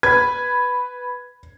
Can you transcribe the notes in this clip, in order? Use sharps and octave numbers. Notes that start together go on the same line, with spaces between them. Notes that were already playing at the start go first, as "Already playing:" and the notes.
B4 G#6